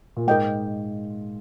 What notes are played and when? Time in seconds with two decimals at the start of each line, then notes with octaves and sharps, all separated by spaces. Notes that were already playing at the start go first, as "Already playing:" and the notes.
0.17 A#2
0.27 G#2 A#4 D#5 G5